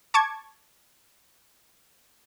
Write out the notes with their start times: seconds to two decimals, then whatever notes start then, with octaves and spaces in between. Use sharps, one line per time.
0.14 A5 C#6 D6 G#6